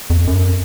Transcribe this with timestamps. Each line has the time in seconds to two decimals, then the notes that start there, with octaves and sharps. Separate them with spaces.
0.10 F2
0.27 F#2